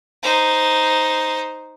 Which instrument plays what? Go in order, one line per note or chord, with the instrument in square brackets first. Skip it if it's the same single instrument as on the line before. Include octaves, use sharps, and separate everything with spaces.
[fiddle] D#4 C5